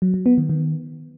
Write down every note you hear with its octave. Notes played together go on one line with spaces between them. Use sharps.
F#3
F#3
B3
D#3
D#3